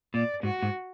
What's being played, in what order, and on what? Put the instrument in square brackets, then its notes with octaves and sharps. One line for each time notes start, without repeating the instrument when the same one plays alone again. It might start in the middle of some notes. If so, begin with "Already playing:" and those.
[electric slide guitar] A#2 [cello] D5
[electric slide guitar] G#2 [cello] F#4
[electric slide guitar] G#2